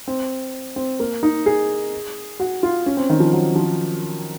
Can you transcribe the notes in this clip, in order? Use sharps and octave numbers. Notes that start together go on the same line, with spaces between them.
C4
C4
A#3
D#4
G#4
F#4
F4
C#4
C4
D#3
F3
F#3
F3